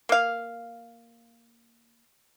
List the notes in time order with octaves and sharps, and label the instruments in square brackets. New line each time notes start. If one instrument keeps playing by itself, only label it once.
[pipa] A#3 F5